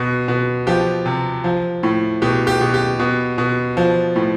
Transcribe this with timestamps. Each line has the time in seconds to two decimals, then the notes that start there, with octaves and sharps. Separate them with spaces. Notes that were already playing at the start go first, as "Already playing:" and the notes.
Already playing: B2
0.28 B2
0.67 F3 G4
1.06 C3
1.44 F3
1.83 A2
2.22 B2 G4
2.47 G4
2.61 B2
2.74 G4
2.99 B2
3.38 B2
3.77 F3
4.16 A2